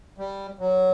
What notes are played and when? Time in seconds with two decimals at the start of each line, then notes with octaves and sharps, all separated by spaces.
0.18 G3
0.59 F#3